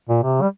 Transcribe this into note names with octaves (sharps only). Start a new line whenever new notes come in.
A#2
C3
G3